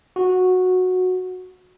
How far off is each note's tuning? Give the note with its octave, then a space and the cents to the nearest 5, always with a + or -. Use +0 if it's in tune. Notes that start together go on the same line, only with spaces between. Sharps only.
F#4 -10